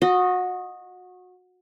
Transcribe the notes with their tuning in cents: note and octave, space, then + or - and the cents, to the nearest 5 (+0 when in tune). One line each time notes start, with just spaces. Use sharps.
F#4 -25 D#5 +0